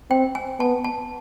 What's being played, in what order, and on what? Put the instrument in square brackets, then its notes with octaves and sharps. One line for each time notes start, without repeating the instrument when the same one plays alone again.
[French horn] C4 [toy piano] G5
[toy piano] G#5
[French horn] B3 [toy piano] A5
[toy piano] A5